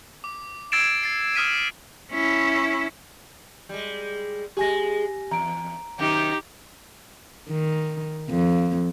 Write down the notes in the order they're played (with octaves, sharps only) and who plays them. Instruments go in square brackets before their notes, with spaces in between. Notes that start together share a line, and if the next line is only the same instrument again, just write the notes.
[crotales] D6
E6 G#6 A6 C7 D7 E7
A6 C7
D#6 F6 B6 D#7
[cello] C#4 E4
[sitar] G3 G#3
[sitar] G#3 G#4 [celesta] G4 G#5 A#6
[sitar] E2 [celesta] A#5 D7
[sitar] F#2 C3 D#3 [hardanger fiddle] D#4 G4
[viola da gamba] D#3
F2